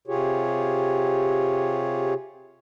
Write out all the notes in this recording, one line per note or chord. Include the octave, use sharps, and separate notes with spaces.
C3 F4 G4 G#4 C#5